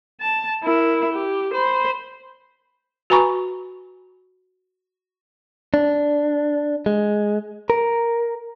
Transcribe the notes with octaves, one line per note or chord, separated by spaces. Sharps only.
A5
E4 A#4
G4
C5 B5
F#4 B4 G#5 A#5 B5 C#6
D4
G#3
A#4